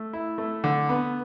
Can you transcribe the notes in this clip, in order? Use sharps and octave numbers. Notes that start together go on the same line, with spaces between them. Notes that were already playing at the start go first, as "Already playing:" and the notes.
Already playing: A3
E4
A3
D3
B3